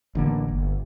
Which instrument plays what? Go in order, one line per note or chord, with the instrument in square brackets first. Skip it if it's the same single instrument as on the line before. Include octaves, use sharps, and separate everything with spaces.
[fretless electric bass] A1 D3 A#3
G1